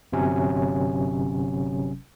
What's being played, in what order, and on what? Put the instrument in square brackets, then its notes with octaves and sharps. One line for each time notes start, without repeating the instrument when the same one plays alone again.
[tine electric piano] G1 C3 F#3 C#4